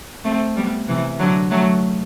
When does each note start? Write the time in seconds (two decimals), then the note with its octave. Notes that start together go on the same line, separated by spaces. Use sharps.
0.25 A3 C4
0.56 G3 B3
0.88 C3 E3
1.19 D3 F#3
1.51 F#3 A3